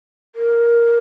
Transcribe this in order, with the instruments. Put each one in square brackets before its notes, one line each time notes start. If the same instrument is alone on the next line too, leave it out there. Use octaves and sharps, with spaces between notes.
[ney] A#4